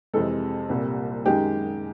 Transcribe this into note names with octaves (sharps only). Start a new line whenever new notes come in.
F2 C3 E3 G#3 A4
C2 A#2 G3
F#2 D#3 G#3 G4